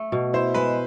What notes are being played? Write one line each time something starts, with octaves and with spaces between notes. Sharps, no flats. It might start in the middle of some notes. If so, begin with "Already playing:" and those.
Already playing: A3
B2
E4 C5
G#3 B4